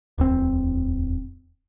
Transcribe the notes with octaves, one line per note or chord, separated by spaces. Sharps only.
D1 E2 C4